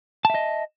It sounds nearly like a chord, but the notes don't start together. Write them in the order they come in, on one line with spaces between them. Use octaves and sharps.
A5 E5 D#5